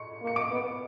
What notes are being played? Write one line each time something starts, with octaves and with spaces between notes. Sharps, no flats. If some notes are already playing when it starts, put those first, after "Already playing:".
Already playing: C6 C#6 C#7
A#3
C#7
D6 D7
B3